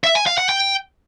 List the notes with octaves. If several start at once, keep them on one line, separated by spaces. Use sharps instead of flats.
E5
G#5
F5
F#5
G5